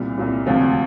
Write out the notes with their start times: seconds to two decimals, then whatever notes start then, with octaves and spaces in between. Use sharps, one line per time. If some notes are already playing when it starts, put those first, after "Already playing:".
Already playing: C2 A#2 G3
0.18 C2 A#2 G3
0.46 D2 C3 F3 C4 F4